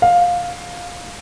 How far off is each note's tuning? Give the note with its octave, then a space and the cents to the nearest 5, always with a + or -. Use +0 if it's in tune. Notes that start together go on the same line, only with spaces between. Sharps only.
F5 +10